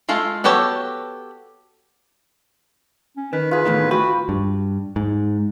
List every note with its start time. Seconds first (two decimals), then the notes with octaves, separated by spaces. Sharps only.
0.09 G#3 A3 F4 A4
0.44 B3 F#4 G4 A4 C#5
3.17 C#4
3.33 D#3 B4
3.51 F4 G#4 B4
3.65 E2 A2 D#3
3.91 F#4 B4 G5
4.29 G2
4.96 G#2